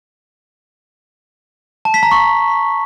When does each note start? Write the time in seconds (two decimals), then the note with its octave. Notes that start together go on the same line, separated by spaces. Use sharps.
1.85 A5
1.94 B6
2.03 A#5
2.11 C#6